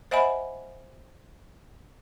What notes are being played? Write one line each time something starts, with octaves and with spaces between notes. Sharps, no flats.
C5 D#5 E5 F#5 G#5 B5